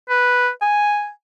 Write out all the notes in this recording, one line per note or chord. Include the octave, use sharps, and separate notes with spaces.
B4
G#5